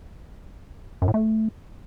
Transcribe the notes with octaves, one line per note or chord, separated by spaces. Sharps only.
F#2
A2
A3